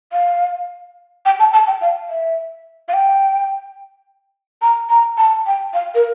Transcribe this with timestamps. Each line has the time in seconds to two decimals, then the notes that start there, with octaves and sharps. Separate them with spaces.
0.13 F5
1.26 G5
1.39 A5
1.53 A5
1.67 G5
1.82 F5
2.10 E5
2.88 F5
2.94 G5
4.62 A#5
4.89 A#5
5.18 A5
5.46 G5
5.74 F5
5.95 A#4